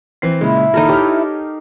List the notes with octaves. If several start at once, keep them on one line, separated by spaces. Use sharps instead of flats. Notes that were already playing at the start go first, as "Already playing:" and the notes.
E3 C4 C7
A#2 C#3 G#3 E4
A#2 D#3 D#4 A4 A#4
G4 C#5 F6